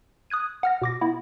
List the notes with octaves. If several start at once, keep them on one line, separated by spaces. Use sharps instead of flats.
D#6 F#6 G#6 D#7
F#5 F6 A#6
B2 D6 A#6
B3 E4